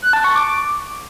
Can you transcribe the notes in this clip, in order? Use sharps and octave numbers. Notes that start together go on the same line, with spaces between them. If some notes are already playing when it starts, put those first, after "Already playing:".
F#6
A5
C#6
D6